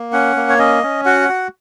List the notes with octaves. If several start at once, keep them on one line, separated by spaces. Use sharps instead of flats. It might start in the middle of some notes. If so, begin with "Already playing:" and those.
Already playing: A#3
C#4 F#5
A#3
C#5
C#4 D#5
C#4
F#4 F#5
F#4